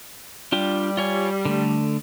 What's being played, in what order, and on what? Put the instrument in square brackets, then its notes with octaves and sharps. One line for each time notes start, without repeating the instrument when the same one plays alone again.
[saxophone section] G3 [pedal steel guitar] D4 F4 G4
[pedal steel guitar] F4 C#5 G#5
D3 A3